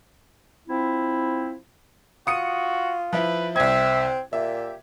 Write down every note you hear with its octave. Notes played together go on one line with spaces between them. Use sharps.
F3 C4 E4
F4 F#4 D#6 C#7 D#7
F3 E4 B4
C2 C4 E5 G#6
A#2 G4 E5